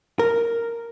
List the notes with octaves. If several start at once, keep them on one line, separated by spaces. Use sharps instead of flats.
A#4